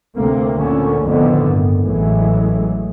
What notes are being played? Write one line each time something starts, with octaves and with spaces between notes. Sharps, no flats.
D2 C3 A3 A#3
D2 A#2 D3 C#4
C2 F2 A2 D3 D#3 B3
G2
A1 A2 E3 F#3 G#3